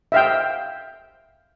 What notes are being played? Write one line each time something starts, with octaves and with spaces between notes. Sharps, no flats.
E5 F5 G5